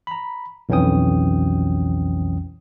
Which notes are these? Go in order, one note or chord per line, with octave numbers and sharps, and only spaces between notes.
A#5 B5
B1 F2 E3 C#4 G5 D#6